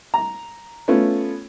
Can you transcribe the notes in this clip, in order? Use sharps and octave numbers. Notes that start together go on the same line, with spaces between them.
A#5
A3 B3 C#4 F4